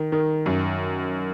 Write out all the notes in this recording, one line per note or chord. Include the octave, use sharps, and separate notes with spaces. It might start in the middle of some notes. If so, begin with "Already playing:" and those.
Already playing: D#3
D#3
F#2